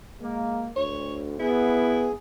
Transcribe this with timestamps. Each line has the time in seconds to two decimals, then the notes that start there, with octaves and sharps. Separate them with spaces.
0.21 G#3 A#3
0.77 D2 C#5
1.39 B3 E4 G#4